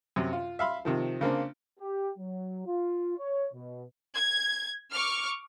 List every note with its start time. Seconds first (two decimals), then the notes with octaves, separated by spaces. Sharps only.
0.16 F#2 C3
0.33 F4
0.59 E5 F5 B5 C6
0.85 C3 D#3 F3
1.21 C#3 A#3 C4 D4
1.80 G4
2.18 F#3
2.67 F4
3.18 C#5
3.53 B2
4.15 G#6
4.91 C#6 D6 F6